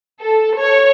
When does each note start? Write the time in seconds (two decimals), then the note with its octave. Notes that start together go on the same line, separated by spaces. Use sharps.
0.21 A4
0.58 C#5